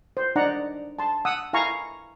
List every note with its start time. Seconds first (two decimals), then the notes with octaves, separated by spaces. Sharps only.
0.17 C5
0.36 D4 D#4 D5 F#5 A#5
0.99 A5 C6
1.25 F#5 D#6 E6
1.53 E4 F5 G#5 A#5 C#6